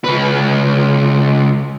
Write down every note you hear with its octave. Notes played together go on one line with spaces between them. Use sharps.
C#2 B4